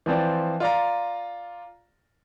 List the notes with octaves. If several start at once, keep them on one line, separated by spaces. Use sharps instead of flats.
E3 F3 C4 D5
F4 D5 A#5